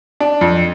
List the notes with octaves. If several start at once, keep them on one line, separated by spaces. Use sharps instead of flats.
D4
F2